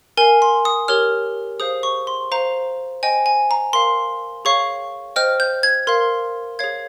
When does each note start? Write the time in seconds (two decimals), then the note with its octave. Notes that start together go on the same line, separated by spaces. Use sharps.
0.17 A#4 F5 G#5
0.42 C6
0.65 D#6
0.88 G4 A#4 C#5 F6
1.60 G#4 C5 F5 D#6
1.83 C#6
2.07 C6
2.32 C5 F5 A#5
3.03 C5 D#5 G5 G#5
3.26 G#5
3.51 A#5
3.73 A#4 F5 C6
4.45 G#4 C#5 F5 C#6
5.16 C5 D#5 G5 F6
5.40 G6
5.63 G#6
5.87 A#4 F5 C6
6.59 G#4 C#5 F5 G#6